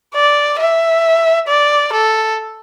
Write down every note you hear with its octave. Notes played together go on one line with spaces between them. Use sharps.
D5
E5
D5
A4